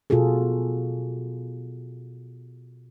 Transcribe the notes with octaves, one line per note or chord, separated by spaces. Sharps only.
B2 F4 F#4 G#4 A4